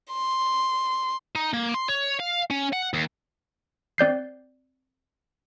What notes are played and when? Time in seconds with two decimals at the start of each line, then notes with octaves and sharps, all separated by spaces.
0.12 C6
1.35 D#4
1.53 A#3
1.74 C6
1.89 C#5
2.20 F5
2.51 C#4
2.73 F#5
2.94 D#2
3.98 C4 D5 G6 C7